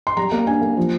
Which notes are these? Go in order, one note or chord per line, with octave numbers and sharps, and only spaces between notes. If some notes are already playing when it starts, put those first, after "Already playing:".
C6
G3 A#5
A#3 A#5
D4 G#5
A#3
F3